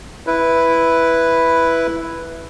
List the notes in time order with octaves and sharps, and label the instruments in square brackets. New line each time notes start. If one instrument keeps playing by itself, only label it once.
[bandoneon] E4 B4